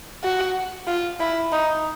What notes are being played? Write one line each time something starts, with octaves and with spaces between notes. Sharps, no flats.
F#4
F4
E4
D#4